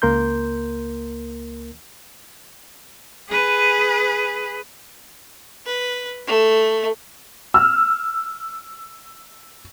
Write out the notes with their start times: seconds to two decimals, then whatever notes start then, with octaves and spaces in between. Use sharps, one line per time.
0.02 C#2 A#3 A#4 C6 G6
3.29 G#4 B4
5.66 B4
6.27 A3
7.54 E6 F6